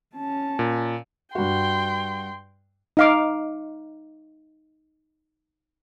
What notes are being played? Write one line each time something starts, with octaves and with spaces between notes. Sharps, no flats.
C#4 A5
A#2
G2 F#4 G5 C6
D#4 F5 D6